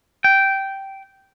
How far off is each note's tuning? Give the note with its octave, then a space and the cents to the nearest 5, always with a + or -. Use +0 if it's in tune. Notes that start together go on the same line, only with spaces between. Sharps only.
G5 -10